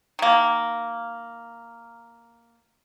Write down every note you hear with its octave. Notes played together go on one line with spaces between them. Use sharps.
D#3 A#3